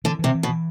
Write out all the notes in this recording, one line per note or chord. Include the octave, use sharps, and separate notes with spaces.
D3 E3
C3 E3
E3
B2
E3